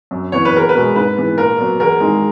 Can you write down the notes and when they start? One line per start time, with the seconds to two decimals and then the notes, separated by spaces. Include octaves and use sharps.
0.11 F#2
0.32 E3 B3 C#5
0.45 B4
0.53 E2 A#4
0.69 B4
0.75 B2 G#3
0.96 G#2 B4
1.17 E3 B3
1.38 A#2 A#4
1.59 F#3 B3
1.80 E2 A#4
2.00 D#3 G#3